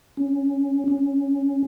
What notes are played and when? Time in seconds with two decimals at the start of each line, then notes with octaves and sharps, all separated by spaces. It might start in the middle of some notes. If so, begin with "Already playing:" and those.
0.17 C#4
0.88 C#4